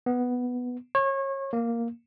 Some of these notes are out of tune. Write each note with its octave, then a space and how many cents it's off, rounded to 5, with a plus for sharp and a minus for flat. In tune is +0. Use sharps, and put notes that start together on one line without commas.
B3 +0
C#5 -30
A#3 +0